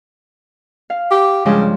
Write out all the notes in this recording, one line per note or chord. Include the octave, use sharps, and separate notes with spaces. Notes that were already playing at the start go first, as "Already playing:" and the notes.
F5
G4
G2 C#3 F3 G#3